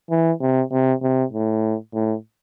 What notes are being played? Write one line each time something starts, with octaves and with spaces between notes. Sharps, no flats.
E3
C3
C3
C3
A2
A2